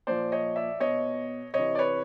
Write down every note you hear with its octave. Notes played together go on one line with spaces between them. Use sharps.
A#2 F3 C5 D5
C#5 D#5
D5 E5
B2 C#5 D#5
C3 E3 C#5 D#5
D5
B4 C#5